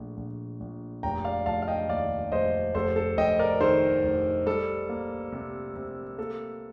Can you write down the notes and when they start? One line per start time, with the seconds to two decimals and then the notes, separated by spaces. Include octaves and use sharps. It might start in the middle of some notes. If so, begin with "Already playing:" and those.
Already playing: A#1 A3
0.17 A#1
0.60 A#1
1.03 F1 G5 A#5
1.25 D5 F5
1.46 F1 F5 A5
1.62 F5
1.68 D#5 G5
1.89 D#2 D5 F5
2.32 F1 C5 D#5
2.74 F1 A4 C5
2.96 A4
3.17 F1 D#5 G5
3.39 A#4 D5
3.60 D#3 A4 C5
4.03 F1
4.46 G3 A4
4.89 A#3
5.32 C3
5.76 C3
6.18 A#3 A4